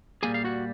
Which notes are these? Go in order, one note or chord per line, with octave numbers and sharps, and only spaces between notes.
A#2 G3 A#3 G#4 G#5
F5
F#4 F#5